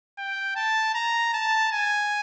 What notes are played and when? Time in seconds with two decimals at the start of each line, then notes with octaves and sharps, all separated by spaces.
0.18 G5
0.56 A5
0.95 A#5
1.33 A5
1.72 G#5